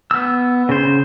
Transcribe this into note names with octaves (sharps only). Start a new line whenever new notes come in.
B3 E6
C#3 C5